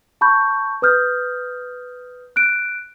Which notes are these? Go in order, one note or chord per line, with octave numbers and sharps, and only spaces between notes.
A5 B5 C#6 G6
B4 D#6 F6 G6
F#6 D7